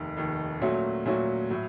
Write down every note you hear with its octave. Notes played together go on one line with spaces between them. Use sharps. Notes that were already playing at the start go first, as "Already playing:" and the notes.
Already playing: F1 D#2 D#3
F1 D#2 D#3
A#2 F#3 A3 C#4 F#4
A#2 F#3 A3 C#4 F#4
A2 F#3